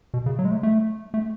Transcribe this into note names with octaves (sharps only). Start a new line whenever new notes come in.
B2
C#3
F#3
G#3
A3
A3
A3